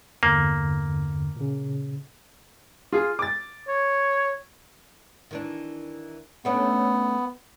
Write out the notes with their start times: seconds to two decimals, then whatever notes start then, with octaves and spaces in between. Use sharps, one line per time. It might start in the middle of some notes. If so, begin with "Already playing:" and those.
0.23 E2 G2 D3 A#3
1.36 A#2 C#3
2.93 F4 G#4
3.19 D6 A6
3.68 C#5
5.31 D#3 E3 D4
6.45 A3 B3 C#4 D4